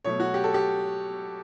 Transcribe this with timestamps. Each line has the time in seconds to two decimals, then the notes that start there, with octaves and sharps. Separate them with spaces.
0.04 B2 F#3 A3 C#5
0.20 F#4
0.34 G4
0.44 A4
0.54 G4